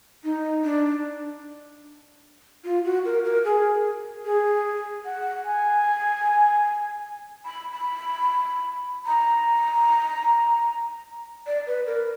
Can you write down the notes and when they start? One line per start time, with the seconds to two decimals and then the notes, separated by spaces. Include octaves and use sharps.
0.24 D#4
0.64 D4
2.64 F4
2.85 F#4
3.05 A#4
3.24 A#4
3.45 G#4
4.25 G#4
5.05 F#5
5.45 G#5
7.45 B5
7.72 B5
9.06 A#5
11.46 D5
11.67 B4
11.86 A#4